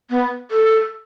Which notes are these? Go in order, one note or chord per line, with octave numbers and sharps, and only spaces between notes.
B3
A4